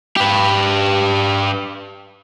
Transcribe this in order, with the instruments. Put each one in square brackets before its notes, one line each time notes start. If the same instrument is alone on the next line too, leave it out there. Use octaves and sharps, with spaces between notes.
[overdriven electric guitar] G4 B4